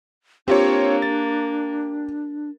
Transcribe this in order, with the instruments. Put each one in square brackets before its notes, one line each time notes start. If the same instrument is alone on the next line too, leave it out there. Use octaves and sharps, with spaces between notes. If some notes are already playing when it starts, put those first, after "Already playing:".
[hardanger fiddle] A#3 [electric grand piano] C4 F4 C#5 [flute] D4 [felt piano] G4
[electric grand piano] A6